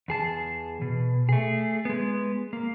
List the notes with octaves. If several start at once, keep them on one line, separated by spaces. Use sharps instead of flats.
E2 G#4 A5
B2
A3 G#4
G#3 B3
A#3